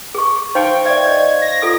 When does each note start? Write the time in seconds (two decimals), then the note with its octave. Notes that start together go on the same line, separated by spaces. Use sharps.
0.15 G#4 C#6
0.55 D#4 C5 F5 G5 C#6
0.86 D5 E5 G#6
1.05 D5 D#5
1.42 A#6
1.62 F4 A4 D#6